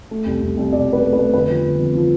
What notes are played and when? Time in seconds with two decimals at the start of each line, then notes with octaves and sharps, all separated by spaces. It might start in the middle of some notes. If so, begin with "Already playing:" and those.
0.11 A3
0.26 C2
0.42 C2
0.57 C2
0.72 B2 D5
0.88 A3
0.93 B4
1.03 A3
1.13 B4
1.18 A3
1.33 G1 B4
1.49 F3
1.64 G1
1.79 F2
1.95 F3